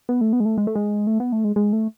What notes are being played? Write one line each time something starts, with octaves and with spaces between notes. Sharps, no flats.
B3
A3
B3
G#3
A3
G#3
A3
G#3
A3
B3
A3
G#3
G#3
A3